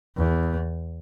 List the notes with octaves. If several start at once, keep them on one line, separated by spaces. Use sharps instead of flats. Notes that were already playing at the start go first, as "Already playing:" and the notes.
E2